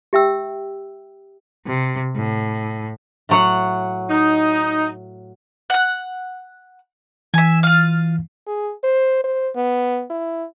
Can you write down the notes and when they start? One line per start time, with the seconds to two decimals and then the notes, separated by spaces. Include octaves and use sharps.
0.13 G4 E5 G5 E6
1.65 C3
2.16 A2
3.29 A2 F#3 F#5
4.10 D#4
5.70 F#5 F#6
7.34 E3 E5 G#5
7.63 F4 F5
8.47 G#4
8.84 C5
9.24 C5
9.56 B3
10.10 E4